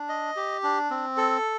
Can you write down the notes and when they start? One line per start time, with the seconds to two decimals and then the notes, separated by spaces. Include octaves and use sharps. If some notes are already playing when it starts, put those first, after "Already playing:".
Already playing: D4
0.09 D#5
0.36 G4
0.63 D4
0.90 C4
1.17 A4